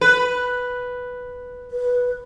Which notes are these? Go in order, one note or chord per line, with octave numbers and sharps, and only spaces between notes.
B4
B4